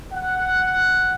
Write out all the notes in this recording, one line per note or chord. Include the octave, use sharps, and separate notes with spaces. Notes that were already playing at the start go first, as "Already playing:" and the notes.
F#5